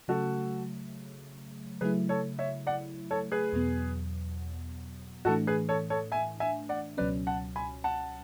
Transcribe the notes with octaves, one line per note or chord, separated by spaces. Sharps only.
C#3 F#3 A3 F#4 A4
C#3 F#3 A3 E4 G#4 B4
A4 C#5
C#5 E5
D5 F#5
A4 C#5
G#4 B4
E2 B2 F#3 B3
A2 E3 A3 D4 F#4 A4
G#4 B4
A4 C#5
A4 C#5
E5 G#5
E5 G#5
D5 F#5
C#2 B2 F#3 C#4 B4 D5
F#5 A5
G#5 B5
F#5 A5